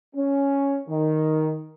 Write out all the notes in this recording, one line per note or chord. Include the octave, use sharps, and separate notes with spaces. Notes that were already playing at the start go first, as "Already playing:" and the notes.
C#4
D#3